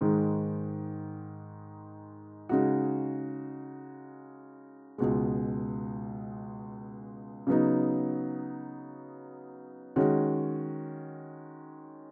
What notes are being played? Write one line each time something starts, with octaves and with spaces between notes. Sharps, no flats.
G#2 D#3 G#3
C#3 G#3 D#4 F#4
C#2 B2 G#3
C#3 F#3 B3 D#4
D#3 G#3 C#4 F#4